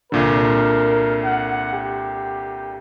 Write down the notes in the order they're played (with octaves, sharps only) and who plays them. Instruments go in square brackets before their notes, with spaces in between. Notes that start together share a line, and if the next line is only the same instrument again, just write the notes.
[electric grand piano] C2 A#2 D3 [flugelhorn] A#4
[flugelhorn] F#5
G4